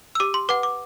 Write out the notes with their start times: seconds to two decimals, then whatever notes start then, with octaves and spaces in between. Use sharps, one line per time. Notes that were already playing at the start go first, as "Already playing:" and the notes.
0.15 E6
0.20 G4 D6
0.34 C6
0.49 B4 F#5 D6
0.63 D6